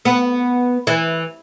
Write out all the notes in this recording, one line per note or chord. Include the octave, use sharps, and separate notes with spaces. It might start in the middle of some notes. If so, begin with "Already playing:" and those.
B3
E3